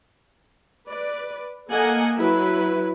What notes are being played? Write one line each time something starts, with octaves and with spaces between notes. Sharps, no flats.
B4 D5
A#3 A4 D#5 F#5 G#5
F#3 E4 B4